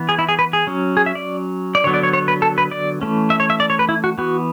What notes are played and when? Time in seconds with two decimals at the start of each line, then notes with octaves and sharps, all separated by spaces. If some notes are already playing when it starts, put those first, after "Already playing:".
Already playing: E3 B3
0.09 G#4
0.19 E4
0.29 G#4
0.39 B4
0.53 G#4
0.67 F#3 C#4
0.97 G#4
1.06 E5
1.15 D5
1.75 D5
1.84 D3 F#3 B3 C#5
1.94 D5
2.03 C#5
2.13 C#5
2.28 B4
2.42 A4
2.58 B4
2.71 D5
3.01 E3 A3 C#4
3.30 E5
3.40 C#5
3.50 E5
3.60 D5
3.70 C#5
3.79 B4
3.89 E4
4.04 F#4
4.18 E3 B3 F#4